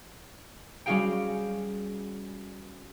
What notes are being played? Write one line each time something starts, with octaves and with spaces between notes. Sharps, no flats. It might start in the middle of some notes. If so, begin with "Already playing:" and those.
G3 C#4 F#4 G#4 F5 G5